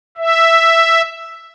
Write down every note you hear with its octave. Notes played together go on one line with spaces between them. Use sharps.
E5